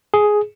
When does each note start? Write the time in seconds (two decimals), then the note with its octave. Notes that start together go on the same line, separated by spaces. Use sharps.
0.14 G#4